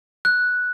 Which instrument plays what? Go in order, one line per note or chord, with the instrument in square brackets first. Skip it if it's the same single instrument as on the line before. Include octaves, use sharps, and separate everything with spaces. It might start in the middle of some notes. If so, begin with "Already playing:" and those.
[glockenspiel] F#6